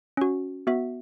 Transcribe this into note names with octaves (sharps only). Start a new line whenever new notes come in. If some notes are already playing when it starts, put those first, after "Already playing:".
C#4 F#4
B3 F#4 E5